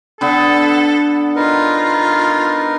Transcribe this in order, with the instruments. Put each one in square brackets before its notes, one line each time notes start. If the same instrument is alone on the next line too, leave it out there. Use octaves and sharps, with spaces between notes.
[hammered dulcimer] D3 B3 [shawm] A4
[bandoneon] D#4 A#4 B4 [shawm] F4